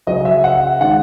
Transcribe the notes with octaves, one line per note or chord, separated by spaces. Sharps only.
C#3 F#3 C#4 D#5
E5
F#5
D#3 G#3 C#4 F#5